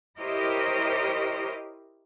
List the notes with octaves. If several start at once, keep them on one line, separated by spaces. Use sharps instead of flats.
E4 G4 A#4 C5 C#5 D#5